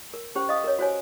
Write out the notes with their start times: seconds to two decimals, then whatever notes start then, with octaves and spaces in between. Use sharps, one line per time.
0.14 A#4
0.35 C#4 G4 C5
0.49 D#5 F5 D#6
0.64 A#4 C#5
0.79 F#4 C5 C#5 G#5